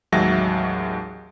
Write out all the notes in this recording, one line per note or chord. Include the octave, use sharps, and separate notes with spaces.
A1 D#2 F#3 G#3 E5 A#6